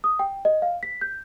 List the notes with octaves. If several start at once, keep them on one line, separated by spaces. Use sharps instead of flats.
D#6
G5
D#5
F5
B6
G6